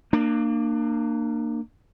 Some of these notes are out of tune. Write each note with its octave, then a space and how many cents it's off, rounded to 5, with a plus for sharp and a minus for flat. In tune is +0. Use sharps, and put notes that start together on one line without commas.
A#3 -15 D4 +30